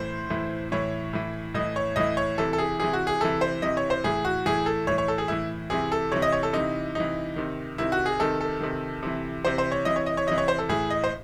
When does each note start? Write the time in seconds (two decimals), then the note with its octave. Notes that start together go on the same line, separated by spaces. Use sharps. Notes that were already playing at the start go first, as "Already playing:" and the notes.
Already playing: A2 E3 C5
0.30 A2 E3
0.72 A2 E3 C#5
1.13 A2 E3
1.54 A2 E3 D#5
1.76 C#5
1.96 A2 E3 D#5
2.17 C#5
2.38 C3 E3 A4
2.53 A4
2.58 G#4
2.80 C3 E3 G#4
2.93 F#4
3.07 G#4
3.20 C3 E3 A4
3.41 C5
3.62 C3 E3 D#5
3.77 C#5
3.90 C5
4.04 A2 E3 G#4
4.25 F#4
4.46 A2 E3 G#4
4.66 A4
4.87 A2 E3 C#5
4.98 C#5
5.08 A4
5.18 G#4
5.28 A2 E3 E4
5.70 C3 E3 G#4
5.92 A4
6.12 C3 E3 C#5
6.22 D#5
6.32 C#5
6.43 A4
6.53 C3 E3 D#4
6.95 C3 E3 D#4
7.36 C3 D#3
7.78 C3 D#3 E4
7.92 F#4
8.06 G#4
8.20 C3 D#3 A4
8.41 A4
8.61 C3 D#3
9.03 C3 E3
9.45 C3 E3 C5
9.58 C5
9.72 C#5
9.85 C3 E3 D#5
9.96 C#5
10.06 D#5
10.17 C#5
10.27 C3 E3 D#5
10.38 C#5
10.48 C5
10.59 A4
10.69 A2 E3 G#4
10.90 D#5
11.04 C5